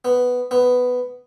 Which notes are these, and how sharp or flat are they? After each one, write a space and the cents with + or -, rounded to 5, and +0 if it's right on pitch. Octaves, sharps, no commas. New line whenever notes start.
B3 +5
B3 +10